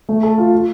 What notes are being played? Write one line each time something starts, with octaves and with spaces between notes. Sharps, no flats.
A3
A4
F4
F4